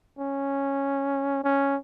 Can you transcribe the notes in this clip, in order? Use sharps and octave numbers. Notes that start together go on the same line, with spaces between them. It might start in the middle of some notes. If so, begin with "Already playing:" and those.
C#4
C#4